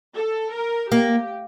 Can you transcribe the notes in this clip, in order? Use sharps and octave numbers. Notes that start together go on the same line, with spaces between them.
A4
A#4
A#3 G4